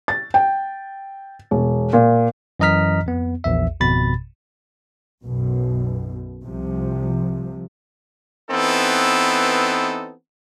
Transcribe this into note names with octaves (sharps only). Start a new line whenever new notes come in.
A6
G5
E1
A#2
F#2 E3 D#5 A#5 F6 B6
F2 B3
A#1 E2 E5
G#1 F2 B2 B5 A6
B1 F#2 B2
C2 C3 F3
E3 B3 C4 D#4 A4